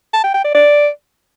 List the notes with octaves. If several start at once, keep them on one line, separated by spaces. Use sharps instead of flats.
A5
G5
G5
D5
D5